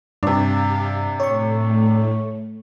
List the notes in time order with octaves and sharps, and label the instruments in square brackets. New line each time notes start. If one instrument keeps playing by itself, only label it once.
[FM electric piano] G2 [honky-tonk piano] C3 D4 [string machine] G4 F5
[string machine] A2 A3 [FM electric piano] C#5 C#6